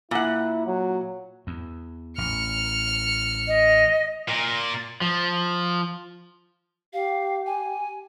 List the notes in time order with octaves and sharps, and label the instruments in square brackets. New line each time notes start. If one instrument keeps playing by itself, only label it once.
[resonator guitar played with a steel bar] A#2 F#5 [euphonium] E4
[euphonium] F#3
[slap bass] E2
[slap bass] A1 [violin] F6 C#7
[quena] D#5
[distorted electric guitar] A#2
[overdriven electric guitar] F3
[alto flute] G4 [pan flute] F5
[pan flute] G#5